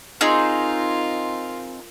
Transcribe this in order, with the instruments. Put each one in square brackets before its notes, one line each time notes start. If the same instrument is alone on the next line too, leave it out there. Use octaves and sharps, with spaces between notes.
[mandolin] C4 D#4 G#4 [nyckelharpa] F4 A#4